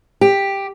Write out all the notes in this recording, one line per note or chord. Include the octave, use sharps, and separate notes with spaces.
G4